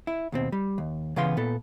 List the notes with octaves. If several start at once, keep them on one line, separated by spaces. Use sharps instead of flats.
E4
D#2 B2 C4
G3
D#2
C#3 E3 B3 F5 C6
A#2 B3 A4